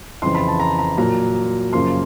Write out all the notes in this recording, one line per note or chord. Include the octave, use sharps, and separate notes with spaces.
F2 C#3 E3 C6
B5
A5
A#5
A#5
A#2 F#3 A#3 A#5
F#2 C#3 F3 A#3 C6